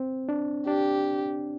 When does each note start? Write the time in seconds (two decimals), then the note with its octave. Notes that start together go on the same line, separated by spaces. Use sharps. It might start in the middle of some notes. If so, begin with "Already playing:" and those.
Already playing: C4
0.29 D4
0.67 D4 G4